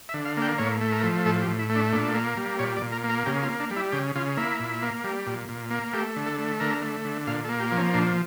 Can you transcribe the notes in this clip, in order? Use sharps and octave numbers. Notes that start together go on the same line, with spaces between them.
E5
D3
F5
A#3 G5
A2 C#5
A3
A#4
F3
A2 A4
G4
A2
E4
A3
D4
A#2 D4
A#3
G3
A#2 C#5
D5
A#2
A#4
A#3
A#4
C#3 G4
F4
A#3
D4
G3
E4
C#3 G4
C#3 F4
A#3 E4
A#2
A#3
G3
A#2
A#2
A#3
A3 G4
D3
A4
A3
D3 A#4
A3
D3
A#2 F5
A4
A#3
G4
F3
C#4
A#2 D4